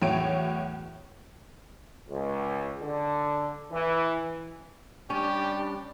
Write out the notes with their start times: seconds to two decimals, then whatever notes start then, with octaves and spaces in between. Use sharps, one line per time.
0.02 E2 A2 F#3 C#5 E5 D7
2.10 C#2
2.81 D3
3.72 E3
5.10 G3 C#4 D4 G4